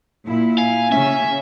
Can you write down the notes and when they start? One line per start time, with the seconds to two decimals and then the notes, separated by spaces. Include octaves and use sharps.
0.24 A#2 E4
0.58 F5 G#5
0.92 C#3 C#4 E5